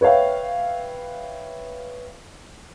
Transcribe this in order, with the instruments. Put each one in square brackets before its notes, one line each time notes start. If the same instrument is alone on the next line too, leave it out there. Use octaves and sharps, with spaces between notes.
[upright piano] B4 C#5 E5 F5 G5